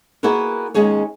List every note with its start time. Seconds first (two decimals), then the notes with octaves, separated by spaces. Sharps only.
0.23 A#3 B3 E4 F#4 G#4 A#4
0.74 D#2 G#3 C#4 G#4 C#5